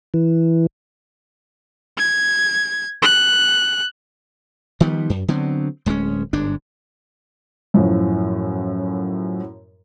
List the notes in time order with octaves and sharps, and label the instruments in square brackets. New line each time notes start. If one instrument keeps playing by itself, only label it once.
[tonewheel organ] E3
[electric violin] G#6
F#6
[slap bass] D#3 F3 G3 B3
F#2
D3 F#3 B3 C4
D1 G#3 A3 C#4
G1 G#2 D4
[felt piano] F#2 A2 F3